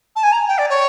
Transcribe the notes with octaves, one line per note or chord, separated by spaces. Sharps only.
A5
G#5
A#5
G5
D5
C#5